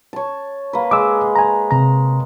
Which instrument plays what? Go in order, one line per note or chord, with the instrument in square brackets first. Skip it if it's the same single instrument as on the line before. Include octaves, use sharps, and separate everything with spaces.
[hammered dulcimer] C#5 A5
A#3 B4
[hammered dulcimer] G#3 [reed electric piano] D6 E6
[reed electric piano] G#5 A#5
C3 A#5